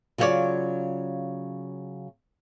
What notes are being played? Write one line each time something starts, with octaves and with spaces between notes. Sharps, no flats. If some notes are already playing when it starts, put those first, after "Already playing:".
C#3 F#3 F4 G4 C#5 D5